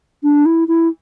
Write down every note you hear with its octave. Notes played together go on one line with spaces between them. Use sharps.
D4
E4
E4